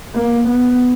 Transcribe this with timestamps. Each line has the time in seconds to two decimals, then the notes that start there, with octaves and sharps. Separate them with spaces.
0.15 A#3
0.48 B3